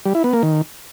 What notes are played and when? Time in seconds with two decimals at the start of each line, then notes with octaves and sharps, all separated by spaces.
0.06 G3
0.15 E4
0.24 B3
0.33 A#3
0.43 D#3